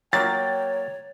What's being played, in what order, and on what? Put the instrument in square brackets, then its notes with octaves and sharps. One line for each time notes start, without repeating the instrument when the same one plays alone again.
[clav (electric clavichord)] F#3 A#3 [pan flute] C#5 [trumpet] G5 [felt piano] A6